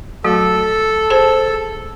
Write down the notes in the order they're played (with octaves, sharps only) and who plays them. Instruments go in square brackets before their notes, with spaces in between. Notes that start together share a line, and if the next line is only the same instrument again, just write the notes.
[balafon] F#3 A3 F#4 [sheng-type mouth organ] A4
[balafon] G#4 C5 A5